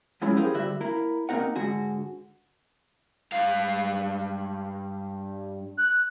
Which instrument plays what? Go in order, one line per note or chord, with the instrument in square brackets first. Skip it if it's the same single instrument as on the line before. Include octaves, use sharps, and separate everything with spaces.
[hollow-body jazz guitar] F3 F#3 G#3 C#4 E4 C#5
E4 G4 G#4 A#4 C5 F5
G2 D3 G3 F#4 E5
A#3 E4 A#4
A#3 C4 D4 D#4 A#4 F#5
G#2 D3 F#4 G#4
[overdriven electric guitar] G2 F5
[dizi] F#6